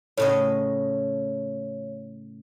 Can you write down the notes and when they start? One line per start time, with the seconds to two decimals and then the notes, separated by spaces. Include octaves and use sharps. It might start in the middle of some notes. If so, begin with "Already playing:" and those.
0.17 A2 C#3 C#5 D#5